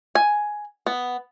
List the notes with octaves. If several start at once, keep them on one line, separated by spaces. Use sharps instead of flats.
G#5
B3